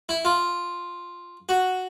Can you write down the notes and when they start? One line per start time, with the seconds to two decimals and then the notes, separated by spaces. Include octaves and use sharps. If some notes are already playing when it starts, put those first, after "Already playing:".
0.09 E4
0.25 F4
1.49 F#4